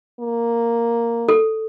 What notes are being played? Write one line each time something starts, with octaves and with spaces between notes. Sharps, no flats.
A#3
A4